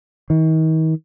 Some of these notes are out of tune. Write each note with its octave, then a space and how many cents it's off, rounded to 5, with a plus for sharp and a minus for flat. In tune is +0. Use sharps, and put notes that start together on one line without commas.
D#3 +40